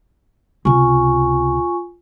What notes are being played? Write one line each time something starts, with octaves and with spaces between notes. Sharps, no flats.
C#2 C3 F4 G#5 C#6